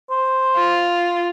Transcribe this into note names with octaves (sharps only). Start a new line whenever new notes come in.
C5
F4